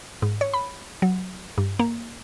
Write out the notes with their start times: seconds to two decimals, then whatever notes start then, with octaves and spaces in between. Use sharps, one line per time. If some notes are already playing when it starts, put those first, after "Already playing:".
0.22 G#2
0.41 C#5
0.54 B5
1.02 F#3
1.58 G2
1.79 A#3